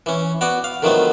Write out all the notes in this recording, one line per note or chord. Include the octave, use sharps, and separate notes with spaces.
E3 C#4
B3 F#4 D5
F5
D3 D#3 F3 F#3 A3 B3